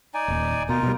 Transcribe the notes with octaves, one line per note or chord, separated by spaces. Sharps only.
D#4 D5 G#5
D#1 A#2
B2 D#4 F4 A#4
B2 G3